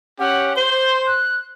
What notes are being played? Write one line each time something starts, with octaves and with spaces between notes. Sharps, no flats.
C#4 G4 F#5
C5 G7
F#6